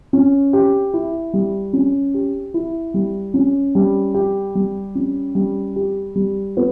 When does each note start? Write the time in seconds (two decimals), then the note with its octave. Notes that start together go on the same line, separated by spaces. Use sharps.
0.13 C#4
0.53 G4
0.94 E4
1.33 G3
1.73 C#4
2.14 G4
2.54 E4
2.94 G3
3.34 C#4
3.75 G3
4.14 G4
4.55 G3
4.95 C#4
5.35 G3
5.76 G4
6.15 G3
6.57 B3